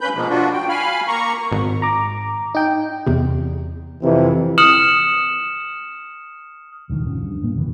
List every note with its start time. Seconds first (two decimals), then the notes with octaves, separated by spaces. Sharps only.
0.01 G2 A#3 C#4 B4 B5 G6
0.15 G#2 B2 F3 G#3 A#3
0.30 D4 F4 F#4
0.53 G5
0.69 F5 G#5 B5 F6
1.08 A#3 A#5 C#6
1.52 G#1
1.82 A#5 D6
2.55 D#4 G5
3.07 E2 C3
4.02 F2 C3 E3
4.58 D#6 F6 C#7 E7 F#7
6.90 D#1 C#2 D#3 F3
7.05 F#1 F3 C#4
7.22 G2
7.42 G#1 A#2 A#3
7.56 E1 C#3 E3 F3